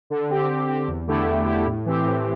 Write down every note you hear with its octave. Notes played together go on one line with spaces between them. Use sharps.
D3
C4 G4
D3
C4 G4
E2
D3 A3 E4 G4
E2
D3 A3 E4 G4
A2
E3 C4 G4
A2